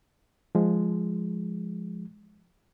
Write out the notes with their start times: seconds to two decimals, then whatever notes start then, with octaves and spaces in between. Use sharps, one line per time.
0.55 F3 G#3